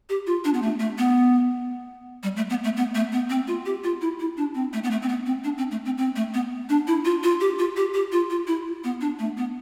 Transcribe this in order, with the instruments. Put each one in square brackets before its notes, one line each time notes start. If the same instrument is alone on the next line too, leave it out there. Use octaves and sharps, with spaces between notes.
[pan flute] G4
F4
D4
B3
A3
A3
B3
G3
A3
B3
A3
B3
A3
B3
C4
F4
G4
F4
E4
E4
D4
C4
A3
B3
A3
C4
B3
C4
D4
C4
A3
C4
C4
A3
B3
D4
E4
F4
F4
G4
F4
G4
G4
F4
F4
E4
B3
D4
A3
B3